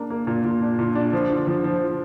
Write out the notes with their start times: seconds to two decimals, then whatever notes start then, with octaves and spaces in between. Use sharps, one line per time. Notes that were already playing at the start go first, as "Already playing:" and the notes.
Already playing: A#3 D4
0.10 A#3
0.27 A#2
0.44 A#2
0.62 D4
0.79 A#2
0.95 D4
1.13 F3
1.30 D3
1.47 F3
1.64 F3